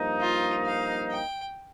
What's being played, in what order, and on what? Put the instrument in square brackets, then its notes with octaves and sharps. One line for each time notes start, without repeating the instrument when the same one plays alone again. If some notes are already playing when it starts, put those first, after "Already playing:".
Already playing: [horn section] G2 F3 A#3 D#4
[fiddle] F4
F5
G5